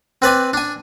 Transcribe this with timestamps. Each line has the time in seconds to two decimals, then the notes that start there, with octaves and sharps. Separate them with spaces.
0.22 C4 B4 D5 G#5
0.53 D4 G#5